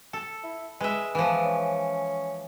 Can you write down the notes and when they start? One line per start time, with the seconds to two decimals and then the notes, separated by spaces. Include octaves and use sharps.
0.13 A4
0.43 E4
0.81 G#3 B4 E5
1.15 E3 F3 B3
1.44 C#4